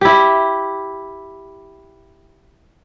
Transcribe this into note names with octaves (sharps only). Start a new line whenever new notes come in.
E4 G4